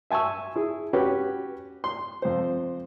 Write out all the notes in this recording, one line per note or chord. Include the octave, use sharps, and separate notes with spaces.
E5 G#5 A5 C#6 E6
E4 G#4
C#4 F#4 G4 B4
C6
F2 C5